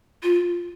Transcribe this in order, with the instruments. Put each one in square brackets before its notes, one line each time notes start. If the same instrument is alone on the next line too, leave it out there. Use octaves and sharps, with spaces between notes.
[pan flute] F4